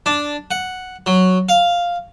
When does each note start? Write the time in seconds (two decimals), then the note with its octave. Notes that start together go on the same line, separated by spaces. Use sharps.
0.06 D4
0.51 F#5
1.06 F#3
1.49 F5